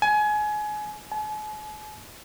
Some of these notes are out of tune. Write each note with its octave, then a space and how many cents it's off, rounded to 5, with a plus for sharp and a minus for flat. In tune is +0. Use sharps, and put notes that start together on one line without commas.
G#5 +25
G#5 +45